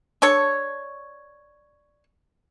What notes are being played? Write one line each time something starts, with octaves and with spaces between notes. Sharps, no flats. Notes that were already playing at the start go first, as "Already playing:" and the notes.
D4 A4 C#5